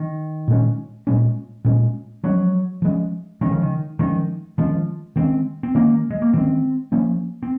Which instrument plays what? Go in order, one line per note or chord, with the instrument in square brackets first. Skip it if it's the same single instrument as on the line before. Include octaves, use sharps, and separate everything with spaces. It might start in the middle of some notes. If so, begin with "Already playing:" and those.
Already playing: [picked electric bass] D#3
[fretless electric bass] A#2 G#3 C#4
A#2 G#3 C#4
A#2 G#3 C#4
[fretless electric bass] F3 G#3 C#4 [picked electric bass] F#3
[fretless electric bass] F3 G#3 C#4
[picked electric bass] D#3 [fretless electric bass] F3 G#3 C#4
[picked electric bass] C#3
D#3
[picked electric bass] D#3 [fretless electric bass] F3 G#3 C#4
[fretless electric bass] D#3 G#3 C#4 [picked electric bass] F3
[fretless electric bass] D#3 G#3 C#4 [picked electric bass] C4
[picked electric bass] C4
[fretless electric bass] D#3 G#3 C#4 [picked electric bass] A#3
[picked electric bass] G#3
A#3
[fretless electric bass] D#3 G#3 C#4 [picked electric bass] C4
[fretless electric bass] F3 A#3 C#4
[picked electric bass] C4